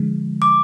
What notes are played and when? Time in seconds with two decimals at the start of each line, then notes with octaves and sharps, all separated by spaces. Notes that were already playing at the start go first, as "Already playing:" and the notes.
Already playing: D3 F3 G#3
0.42 D6